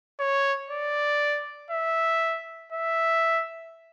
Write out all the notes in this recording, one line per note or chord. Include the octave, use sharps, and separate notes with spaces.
C#5
D5
E5
E5